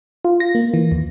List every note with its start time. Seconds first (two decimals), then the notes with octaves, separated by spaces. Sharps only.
0.25 F4
0.40 A#6
0.55 A#3
0.74 E3
0.92 D#2